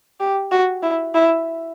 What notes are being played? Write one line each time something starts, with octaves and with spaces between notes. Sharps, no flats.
G4
F#4
E4
E4